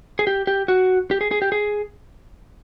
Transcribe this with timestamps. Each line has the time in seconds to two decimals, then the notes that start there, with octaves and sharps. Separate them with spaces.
0.19 G#4
0.27 G4
0.47 G4
0.68 F#4
1.11 G4
1.21 G#4
1.31 G#4
1.42 G4
1.52 G#4